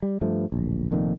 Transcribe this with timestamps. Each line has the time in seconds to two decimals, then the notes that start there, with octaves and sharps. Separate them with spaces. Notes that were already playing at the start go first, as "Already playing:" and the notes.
0.02 G3
0.21 G2 F3 A3
0.52 D1 A#1
0.91 F1 F2 A#2 D#3